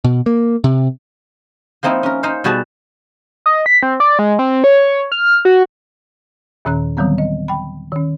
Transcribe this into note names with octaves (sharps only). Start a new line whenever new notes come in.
B2
A#3
C3
F3 A#3 C4 D#4 E4
C#4 A#4
D#4 C5 F5
B2 G3 F#4 G#4 A5
D#5
B6
C4
D5
G#3
C4
C#5
F6
F#4
D#2 A#2 D#3 C#4 A#5 F#6
D3 D#3 F#3 G3 B3 C4
D#5
G5 B5
D#3 C#4